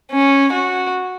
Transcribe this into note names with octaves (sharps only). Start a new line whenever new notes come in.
C#4
F#4